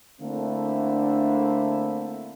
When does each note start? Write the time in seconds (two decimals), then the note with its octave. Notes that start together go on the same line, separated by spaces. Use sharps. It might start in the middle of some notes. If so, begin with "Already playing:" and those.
0.20 D3 A3 A#3 C4 D4 E4